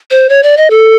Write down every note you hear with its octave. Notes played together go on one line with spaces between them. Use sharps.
C5
C#5
D5
D#5
A4